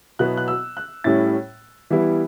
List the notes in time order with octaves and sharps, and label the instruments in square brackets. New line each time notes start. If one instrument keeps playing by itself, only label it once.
[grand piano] B2 F#3 B3 E4 F#6
F#6
E6
F#6
A2 G3 C#4 E4 A6
E3 G3 B3 E4